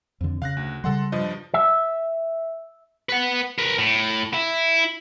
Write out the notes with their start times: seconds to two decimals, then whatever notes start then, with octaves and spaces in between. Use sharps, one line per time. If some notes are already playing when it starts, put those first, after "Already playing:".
0.21 F2 D3
0.42 C#3 F5 F#6 A#6
0.57 D2
0.84 C#3 G3 A4 F#5 C6
1.12 G2 F3 D#5
1.54 E5
3.09 B4 F#5
3.58 A#4 B4
3.78 A2
4.34 E4